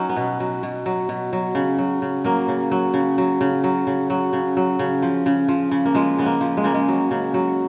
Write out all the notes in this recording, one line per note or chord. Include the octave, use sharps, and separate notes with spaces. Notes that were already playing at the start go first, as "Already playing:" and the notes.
Already playing: F#3 C#4 D#4
B3
B2
F#3
B2
F#3
B2
F#3
C#3
F#3
C#3
F#3 A#3
C#3
F#3
C#3
F#3
C#3
F#3
C#3
F#3
C#3
F#3
C#3
F3
C#3
F3
C#3
A#3
F3 G#3
C#3 B3
A#3
F3
G#3
C#3 A#3
G#3
F#3
C#3
F#3